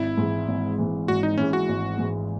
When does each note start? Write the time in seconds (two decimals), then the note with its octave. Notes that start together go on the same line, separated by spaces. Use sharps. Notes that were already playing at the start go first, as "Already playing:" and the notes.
Already playing: G#1 E4
0.18 G#2 E3
0.48 G#1
0.78 G#2 E3
1.08 G#1 F#4
1.23 D#4
1.38 G#2 E3 C#4
1.53 F#4
1.69 G#1
1.98 G#2 E3